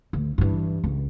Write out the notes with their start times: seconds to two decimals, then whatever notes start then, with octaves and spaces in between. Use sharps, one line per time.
0.13 D2
0.38 G2 E3
0.84 C#2